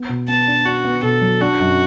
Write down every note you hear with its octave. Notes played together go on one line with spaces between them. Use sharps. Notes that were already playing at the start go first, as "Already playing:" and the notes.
Already playing: B3
B2
B3 A5
D4
D4 F#4
B3
B2 A4
F#3
D4 F#4
F#2